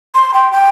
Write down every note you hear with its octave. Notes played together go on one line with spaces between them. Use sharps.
C6
G5
G5